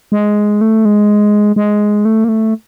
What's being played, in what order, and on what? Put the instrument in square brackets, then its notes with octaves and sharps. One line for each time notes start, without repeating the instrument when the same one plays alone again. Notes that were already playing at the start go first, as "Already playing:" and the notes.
[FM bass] G#3
A3
G#3
G#3
A3
A#3
A3